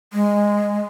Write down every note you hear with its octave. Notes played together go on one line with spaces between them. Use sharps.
G#3